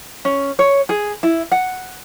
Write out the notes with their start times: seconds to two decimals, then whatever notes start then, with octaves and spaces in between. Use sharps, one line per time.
0.25 C#4
0.59 C#5
0.89 G#4
1.23 E4
1.52 F#5